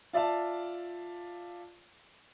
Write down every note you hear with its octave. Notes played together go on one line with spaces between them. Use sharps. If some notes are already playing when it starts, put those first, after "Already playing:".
F4 D5 E5 F5 A5